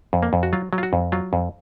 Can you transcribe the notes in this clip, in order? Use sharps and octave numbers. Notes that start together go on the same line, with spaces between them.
F2
A#3
F2
F#4
F#3 F4
F#3
F4
F#4
F2
F#3 F4
F2